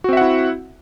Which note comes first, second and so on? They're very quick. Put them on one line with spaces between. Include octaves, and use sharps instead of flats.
F#4 C4 E5 F#5 E4